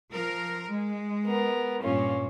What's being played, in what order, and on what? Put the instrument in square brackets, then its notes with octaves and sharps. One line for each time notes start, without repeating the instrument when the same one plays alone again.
[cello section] F3 A#4
G#3
[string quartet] B3 A#4
[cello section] G2 A#2 [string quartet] C#4 F4